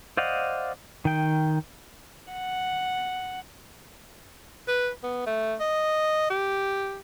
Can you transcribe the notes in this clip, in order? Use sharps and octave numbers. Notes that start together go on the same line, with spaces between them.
C5 D5 D#5 F5 F#5
D#3 G5
F#5
B4
B3
A3
D#5
G4